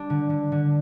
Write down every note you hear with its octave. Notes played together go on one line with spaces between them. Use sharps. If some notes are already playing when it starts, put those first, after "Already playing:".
Already playing: G3 D4
D3
D3
D3